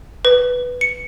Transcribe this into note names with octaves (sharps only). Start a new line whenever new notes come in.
B4
C#7